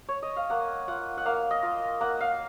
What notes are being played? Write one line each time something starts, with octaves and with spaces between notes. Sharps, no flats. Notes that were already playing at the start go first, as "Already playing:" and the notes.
C#5
D#5
F5
A#3 F#5
F4 F#5
F#5
A#3 F5
D#5
F4
A#3 F#5
F5